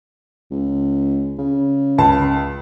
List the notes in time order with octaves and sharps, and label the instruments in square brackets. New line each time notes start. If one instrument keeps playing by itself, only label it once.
[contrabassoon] C#2
C#3
[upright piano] C#2 A5